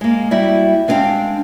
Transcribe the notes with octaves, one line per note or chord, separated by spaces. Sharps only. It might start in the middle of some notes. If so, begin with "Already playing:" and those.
G#3 A#3
G3 E4 F#4 D5 E5
G#3 B3 C4 D4 F5 G5